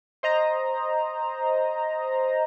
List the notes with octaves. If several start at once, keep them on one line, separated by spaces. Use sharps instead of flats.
C5 D#5 A#5